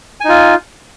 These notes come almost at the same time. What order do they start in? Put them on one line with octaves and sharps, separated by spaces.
G#5 D#4 F4